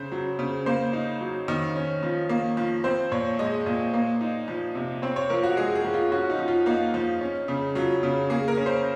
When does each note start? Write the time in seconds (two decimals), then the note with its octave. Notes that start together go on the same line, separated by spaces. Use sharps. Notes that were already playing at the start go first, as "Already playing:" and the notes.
Already playing: C#3 C5
0.12 F#3
0.39 C#3
0.66 A#3 C5
0.93 D#4
1.21 F#3
1.48 D#3
1.76 C#4
2.03 F3
2.29 A#3
2.57 F3
2.84 C4 C5
3.12 A#2 C#5
3.39 G#3 D#5
3.66 A#2
3.94 A#3
4.21 D#4
4.48 F3
4.75 C3
5.02 C4 C#5
5.16 C#5
5.30 F3 A#4
5.43 F#4
5.57 G#3 G#4
5.75 G#4
5.85 F3
5.94 F4
6.12 C#4 F#4
6.30 D#4
6.39 F3
6.48 F4
6.66 A#3 D#4
6.94 F3
7.21 C#4
7.48 C#3
7.75 F#3 F4
8.03 C#3
8.30 A#3 G#4
8.48 A#4
8.57 C#4
8.66 C5